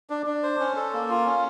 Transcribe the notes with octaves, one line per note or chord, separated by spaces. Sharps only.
D4
D4
C5
C#4
A4
A#3
F4
C#4